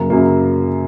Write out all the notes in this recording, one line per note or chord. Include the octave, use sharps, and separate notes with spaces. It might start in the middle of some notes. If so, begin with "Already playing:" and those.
Already playing: F#2 C#3 F#3 A#3 A#4 A#5
F#2 C#3 F#3 A#3